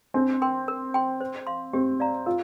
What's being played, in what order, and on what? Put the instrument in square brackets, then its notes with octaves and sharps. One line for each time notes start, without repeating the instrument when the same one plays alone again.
[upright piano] C4 [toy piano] D4
[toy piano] A#4 G5 C6
A#4
G5 C6
C5
F5 C6
[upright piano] C4 [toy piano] G4
[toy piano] D5 F5 A#5
[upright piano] F4 [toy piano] A#4